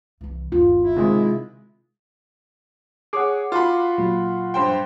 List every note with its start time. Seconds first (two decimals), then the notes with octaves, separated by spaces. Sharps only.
0.21 C2 E3
0.52 G1 D#2 F4
0.82 E4
0.96 C3 D#3 G#3
3.13 G#4 C#5 F#5 D6
3.52 F4 F#4 B5
3.98 A#2 F#3
4.54 G2 C5 G5